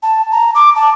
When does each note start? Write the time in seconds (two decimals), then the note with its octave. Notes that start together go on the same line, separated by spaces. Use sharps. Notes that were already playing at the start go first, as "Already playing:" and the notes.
0.03 A5
0.32 A#5
0.55 D6
0.76 A5